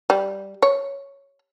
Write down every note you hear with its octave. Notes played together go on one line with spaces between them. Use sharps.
G3
C#5